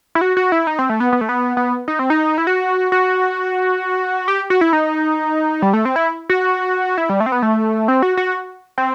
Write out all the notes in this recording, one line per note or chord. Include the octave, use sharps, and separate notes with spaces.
E4
F#4
F#4
E4
D#4
C4
A3
B3
B3
A3
B3
B3
D#4
C4
D#4
E4
F#4
F#4
G4
F#4
E4
D#4
G3
A3
C4
E4
F#4
E4
G3
A3
C4
B3
A3
C4
F#4
F#4
C4